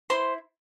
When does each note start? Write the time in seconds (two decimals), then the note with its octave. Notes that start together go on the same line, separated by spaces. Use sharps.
0.10 E4 C5 C6